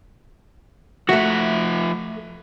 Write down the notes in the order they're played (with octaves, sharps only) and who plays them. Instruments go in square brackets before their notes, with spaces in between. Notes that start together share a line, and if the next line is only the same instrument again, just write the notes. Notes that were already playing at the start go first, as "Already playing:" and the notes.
[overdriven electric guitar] F3 E5 [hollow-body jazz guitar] A3 F#4